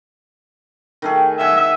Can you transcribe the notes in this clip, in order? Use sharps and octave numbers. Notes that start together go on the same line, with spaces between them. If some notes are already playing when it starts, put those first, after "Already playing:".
D#3 A3 G#4
D#5 E5 F#5 G#5